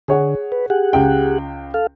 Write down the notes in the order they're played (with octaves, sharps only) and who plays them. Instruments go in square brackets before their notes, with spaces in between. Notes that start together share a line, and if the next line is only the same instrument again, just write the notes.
[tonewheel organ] D3 [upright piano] G#4 C#5 F#5
[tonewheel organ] B4
G4 G#4 F#5
[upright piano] C#2 G5
[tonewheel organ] A4 F5